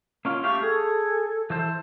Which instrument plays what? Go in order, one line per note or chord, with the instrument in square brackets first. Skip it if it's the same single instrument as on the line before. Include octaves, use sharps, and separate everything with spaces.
[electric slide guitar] A#3 C#4 F4
[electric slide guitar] A3 G4 F5 [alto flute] C#6
[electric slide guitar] G#4 [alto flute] A4
[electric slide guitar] E3 A4 C5